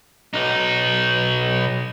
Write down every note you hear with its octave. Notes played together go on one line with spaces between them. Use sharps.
B1 D#4